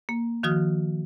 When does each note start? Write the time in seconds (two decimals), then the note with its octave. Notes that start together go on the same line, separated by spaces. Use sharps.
0.09 A#3
0.43 D#3 F3 F#4 D#6 F6